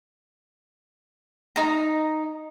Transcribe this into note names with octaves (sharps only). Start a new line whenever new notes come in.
D#4 A#5